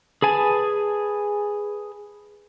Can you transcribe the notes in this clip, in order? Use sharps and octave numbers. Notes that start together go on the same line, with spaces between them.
G#4 B4 G#5 A5